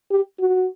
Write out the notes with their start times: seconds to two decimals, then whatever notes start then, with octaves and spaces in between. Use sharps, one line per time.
0.11 G4
0.40 F#4